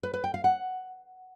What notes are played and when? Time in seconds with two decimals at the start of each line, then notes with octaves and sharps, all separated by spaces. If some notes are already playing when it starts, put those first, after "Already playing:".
0.03 B4
0.14 B4
0.24 G5
0.34 F5
0.44 F#5